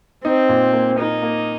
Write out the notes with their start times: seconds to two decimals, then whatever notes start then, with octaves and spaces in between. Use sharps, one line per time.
0.24 C4 D#4
0.49 A#2
0.73 A#3
0.98 D#4 A#4
1.22 A#3